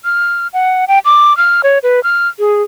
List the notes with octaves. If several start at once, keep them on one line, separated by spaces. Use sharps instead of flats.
F6
F#5
G5
D6
F6
C#5
B4
F6
G#4